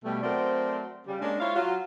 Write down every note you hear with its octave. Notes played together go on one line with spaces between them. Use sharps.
B2 G3 A3
F#3 A3 C4 A#4 C5 D5
C#3 G3
G#3 A#3 C#4 D4
E4 F4 C5 C#5 F5
F#3 F4